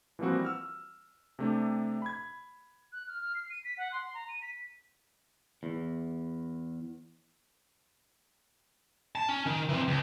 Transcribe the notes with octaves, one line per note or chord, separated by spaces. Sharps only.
E3 F3 G3 A#3 C4 F#4
E6 F6
C3 A3 D4 G4
B5 G#6
F#6
F6
F6
C7
D#7
B6
F#5
C6
A#5
D#7
B6
E2
A5
C#4
D#3
E3 C4
C#2